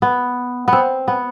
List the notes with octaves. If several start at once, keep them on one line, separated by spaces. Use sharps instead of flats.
B3
B3 C4
B3